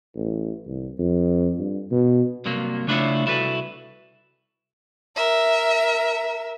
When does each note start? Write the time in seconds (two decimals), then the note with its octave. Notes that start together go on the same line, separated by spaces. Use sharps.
0.16 A1
0.67 C2
0.99 F2
1.59 G2
1.91 B2
2.45 G2 C3 F#3 A#3
2.87 C#3 A3 D4 E4 F4 C#5
3.26 C2 E4 F#4 A4 B4
5.16 A#4 E5